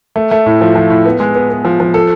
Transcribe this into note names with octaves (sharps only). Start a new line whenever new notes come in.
A3
A3
A2
F3
F3
A2
B3
G#3
B3
B3
F3
F3
A4